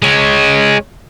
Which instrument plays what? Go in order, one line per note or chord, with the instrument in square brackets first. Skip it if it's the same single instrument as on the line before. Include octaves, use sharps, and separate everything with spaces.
[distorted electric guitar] G#3 C#5